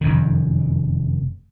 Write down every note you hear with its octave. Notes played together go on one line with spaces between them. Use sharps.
F1 F#2 D#3